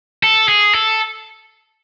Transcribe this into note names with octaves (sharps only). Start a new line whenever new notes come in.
A4
G#4
A4